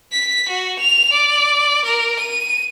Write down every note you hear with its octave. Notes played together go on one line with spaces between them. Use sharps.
B6
F#4
F7
D5
A#4
D#7